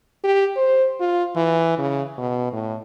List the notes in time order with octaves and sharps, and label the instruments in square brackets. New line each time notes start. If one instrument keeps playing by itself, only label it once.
[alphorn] G4
C5
F4
E3
C#3
B2
A2